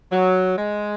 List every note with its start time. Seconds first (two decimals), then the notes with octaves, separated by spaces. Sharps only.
0.12 F#3
0.57 G#3